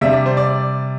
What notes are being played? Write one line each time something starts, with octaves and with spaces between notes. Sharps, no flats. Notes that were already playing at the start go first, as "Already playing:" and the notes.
C3 G3 D4 E5
D5
C5
D5